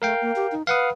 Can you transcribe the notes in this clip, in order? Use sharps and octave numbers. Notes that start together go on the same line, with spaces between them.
A3 A#4 F5 G5
A#3
G4
D#4
B4 F5 F#5 D#6